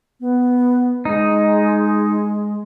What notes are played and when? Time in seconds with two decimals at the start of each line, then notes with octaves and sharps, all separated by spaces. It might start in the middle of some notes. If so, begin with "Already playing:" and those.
0.20 B3
1.05 G#3 D#4